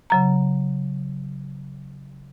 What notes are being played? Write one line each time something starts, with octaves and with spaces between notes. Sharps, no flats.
C#3 F#3 A#5